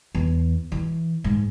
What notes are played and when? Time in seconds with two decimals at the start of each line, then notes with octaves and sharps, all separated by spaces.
0.15 E2
0.72 E3
1.24 G#2